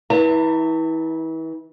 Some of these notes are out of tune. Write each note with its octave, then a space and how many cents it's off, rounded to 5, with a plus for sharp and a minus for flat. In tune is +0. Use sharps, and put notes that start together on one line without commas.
E3 -35 E5 -5 A5 +45